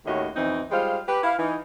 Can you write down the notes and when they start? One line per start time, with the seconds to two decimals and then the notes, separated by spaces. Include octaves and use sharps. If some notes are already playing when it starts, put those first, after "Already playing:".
0.06 D#2 A2 C#4 F#4 D#5
0.35 F2 B2 E3 C4 D#4
0.71 G3 G#3 F4 C5 F5
1.07 G4 B4
1.24 E4 F5
1.38 E3 D#4